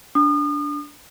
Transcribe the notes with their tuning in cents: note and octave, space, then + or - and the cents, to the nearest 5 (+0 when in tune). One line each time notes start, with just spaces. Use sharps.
D4 -10 D#6 -35